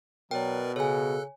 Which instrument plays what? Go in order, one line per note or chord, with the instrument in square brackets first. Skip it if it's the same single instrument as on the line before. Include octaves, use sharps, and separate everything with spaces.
[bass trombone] B2 [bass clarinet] F#3 [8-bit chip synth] A#4 B4 D5 [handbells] G5
[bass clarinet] C#3 [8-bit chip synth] A4 F#6 [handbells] C#5 G#5